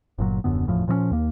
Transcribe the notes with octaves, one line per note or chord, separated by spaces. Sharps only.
G1 A#2 F#3
D#1 F#2 D3 B3
F#1 E2 A2 F3
A#2 F3 G#3 C#4
D#2 A#3